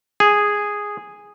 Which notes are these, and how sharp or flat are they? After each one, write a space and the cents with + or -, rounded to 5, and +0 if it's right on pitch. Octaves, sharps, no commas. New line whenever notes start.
G#4 -5